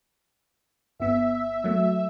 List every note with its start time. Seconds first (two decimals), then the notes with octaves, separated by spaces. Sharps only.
0.99 G1 B3 E5
1.64 F#3 A3